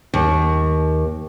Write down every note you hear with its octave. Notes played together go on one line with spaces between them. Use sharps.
D#2